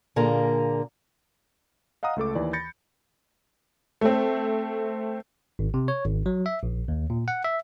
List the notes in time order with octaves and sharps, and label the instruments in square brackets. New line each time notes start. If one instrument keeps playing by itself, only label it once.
[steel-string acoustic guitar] A#2 D3 A#3 G#4 A#4 A#5
[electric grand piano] D#5 F5 F#5 A#5 D#6
C#2 A3 A4 D6
D#2 E3 D5
B5 G6 A6 A#6 C#7
[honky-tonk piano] A3 C4
[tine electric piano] G#1
C3
C#5
G#1
F#3
E5
A#1
D#2
A#2
F#5
E5